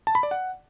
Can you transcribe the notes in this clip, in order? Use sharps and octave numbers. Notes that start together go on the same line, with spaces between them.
A5
B5
D5
F#5